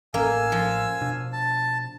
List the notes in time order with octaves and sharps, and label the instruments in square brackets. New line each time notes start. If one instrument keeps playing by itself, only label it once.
[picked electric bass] A1 C#4 [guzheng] A#3 [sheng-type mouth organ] F5 G#5 E6
[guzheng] F3
[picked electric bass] B2 D4
[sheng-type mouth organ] A5